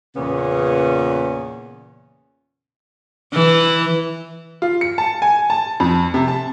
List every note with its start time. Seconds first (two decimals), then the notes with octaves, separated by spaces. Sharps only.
0.16 E2 A#2 C#3 B3 C#4
3.33 E3
4.62 F4
4.81 C#7
4.98 A5
5.22 G#5
5.50 A5
5.80 F2
6.14 C3
6.28 A5